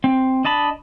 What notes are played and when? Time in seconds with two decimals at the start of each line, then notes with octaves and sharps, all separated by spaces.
0.04 C4
0.44 D4 D#5 A5 B5